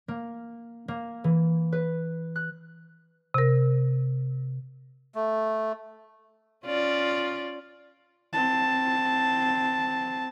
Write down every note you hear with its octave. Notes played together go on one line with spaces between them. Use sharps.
A#3
A#3
E3
B4
F#6
C3 A#4
A3
C#4 F4 D5
C4 A5